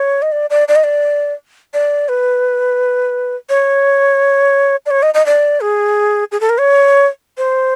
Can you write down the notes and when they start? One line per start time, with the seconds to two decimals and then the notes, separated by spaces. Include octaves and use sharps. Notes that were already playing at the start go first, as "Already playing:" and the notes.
Already playing: C#5
0.22 D#5
0.32 D5
0.50 D5
0.68 D5
0.76 D#5
0.84 D5
1.74 D5
2.09 B4
3.49 C#5
4.86 D5
4.91 C#5
5.03 D#5
5.14 D#5
5.26 D5
5.61 G#4
6.32 G#4
6.41 A4
6.49 A#4
6.58 C#5
7.38 C5